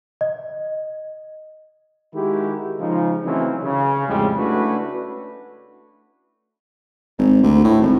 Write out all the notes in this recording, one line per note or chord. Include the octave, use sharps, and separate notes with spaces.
D#5
D#3 G#3 E4 F#4 G4
C#3 F3 G#3 D#4
C#3 E3 F#3 A3 C4 C#4
C#3
F2 A2 G3 G#3
A3 C#4 D4 E4 F#4 B4
G#1
D2
A2
G#1